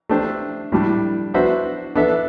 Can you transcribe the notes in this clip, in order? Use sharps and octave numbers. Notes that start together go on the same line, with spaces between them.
A3 D4 G4 C5
A2 G3 D4
B3 D4 F#4 C5 E5
B3 D4 A4 E5